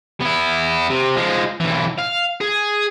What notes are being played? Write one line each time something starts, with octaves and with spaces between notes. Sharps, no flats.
B3 E4
C3
F3 G#3
B1 E3
F5
G#4